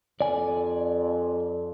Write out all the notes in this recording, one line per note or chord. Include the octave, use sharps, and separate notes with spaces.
F2 D5 G#5